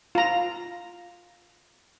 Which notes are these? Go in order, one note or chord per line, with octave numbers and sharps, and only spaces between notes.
F4 A#5